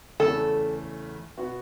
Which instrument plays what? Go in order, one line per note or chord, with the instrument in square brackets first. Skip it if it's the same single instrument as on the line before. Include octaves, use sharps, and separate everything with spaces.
[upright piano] E2 C#3 A3 [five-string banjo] A4
[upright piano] B2 B3 F#4